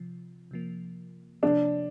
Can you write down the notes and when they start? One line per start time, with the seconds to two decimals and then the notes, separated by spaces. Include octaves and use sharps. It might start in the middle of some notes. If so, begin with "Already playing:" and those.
Already playing: C3 F3
0.51 C3 F3 A#3
1.42 C3 F3 A#3 D4